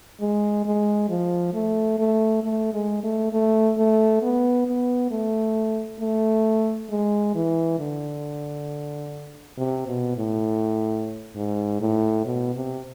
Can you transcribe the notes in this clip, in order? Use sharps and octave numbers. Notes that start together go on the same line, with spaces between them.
G#3
G#3
F3
A3
A3
A3
G#3
A3
A3
A3
B3
B3
A3
A3
G#3
E3
D3
C3
B2
A2
G#2
A2
B2
C3